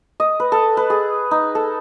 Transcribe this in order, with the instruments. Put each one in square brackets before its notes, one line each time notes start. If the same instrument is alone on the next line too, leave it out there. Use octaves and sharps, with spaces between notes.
[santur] D#5
B4
A4
B4
G#4
D#4
A4